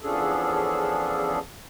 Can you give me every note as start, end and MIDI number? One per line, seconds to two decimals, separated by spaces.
0.01 1.39 40
0.01 1.39 53
0.01 1.39 61
0.01 1.39 62
0.01 1.39 68
0.01 1.39 69